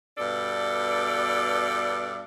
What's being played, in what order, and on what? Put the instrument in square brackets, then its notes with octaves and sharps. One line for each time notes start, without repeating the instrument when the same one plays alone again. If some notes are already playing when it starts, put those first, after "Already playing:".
[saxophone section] G2 B2 A4 D5